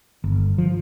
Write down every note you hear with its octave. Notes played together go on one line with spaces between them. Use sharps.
G1
F3